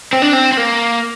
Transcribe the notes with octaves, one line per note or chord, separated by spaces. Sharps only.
C4
D4
C4
C4
A#3